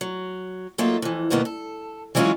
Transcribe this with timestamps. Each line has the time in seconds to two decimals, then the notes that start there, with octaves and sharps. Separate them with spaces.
0.01 F#3
0.78 F#3 A#3 D#4 F4 A4 E5
1.02 F2 E3
1.30 D2 G2 B2 D#3 A#3 B3
1.45 A4
2.15 E3 F#3 G#3 C#4 E4 F4